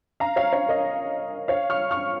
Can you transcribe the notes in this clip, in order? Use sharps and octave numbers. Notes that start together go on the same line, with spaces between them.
F5 A#5
C#5 F5
C#5 F5
A#4 D#5
C#5 F5
C#6 F6
C#6 F6